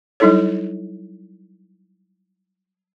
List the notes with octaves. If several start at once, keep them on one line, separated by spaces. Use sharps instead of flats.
F#3 G3 D#4 E4 A4 C#5